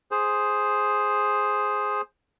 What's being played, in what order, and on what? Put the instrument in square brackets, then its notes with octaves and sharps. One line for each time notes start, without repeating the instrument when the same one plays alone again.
[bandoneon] G#4 C5